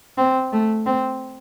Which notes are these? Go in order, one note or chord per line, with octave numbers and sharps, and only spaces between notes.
C4
A3
C4